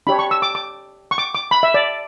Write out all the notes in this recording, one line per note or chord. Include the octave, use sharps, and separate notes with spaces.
D4 G4 C#5 B5
C#6
E6
D6
D6
C#6
D6
D6
B5
E5
D5